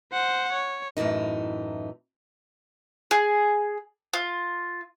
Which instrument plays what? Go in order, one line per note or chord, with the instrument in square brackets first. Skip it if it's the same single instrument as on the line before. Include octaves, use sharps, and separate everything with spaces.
[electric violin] C5 F#5
C#5
[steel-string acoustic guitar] F#2 A2 C#3 E3 D#4
[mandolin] G#4
F4